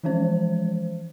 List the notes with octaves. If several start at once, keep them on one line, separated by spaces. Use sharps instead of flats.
E3 F3 G#3 C#4 C5